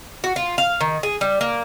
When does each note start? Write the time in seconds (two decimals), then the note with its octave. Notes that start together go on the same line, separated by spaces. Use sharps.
0.24 F#4
0.36 F4
0.58 F5
0.81 D#3
1.03 G#4
1.21 G3
1.41 A#3